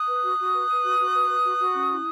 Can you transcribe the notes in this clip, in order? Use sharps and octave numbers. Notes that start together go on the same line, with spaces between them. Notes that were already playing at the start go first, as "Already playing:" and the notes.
Already playing: D#6 F#6
B4
F#4
F#4
B4
B4
F#4
F#4
B4
B4
F#4
F#4
C#4
E4